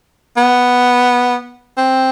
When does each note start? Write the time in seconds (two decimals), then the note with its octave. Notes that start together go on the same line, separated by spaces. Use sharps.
0.37 B3
1.78 C4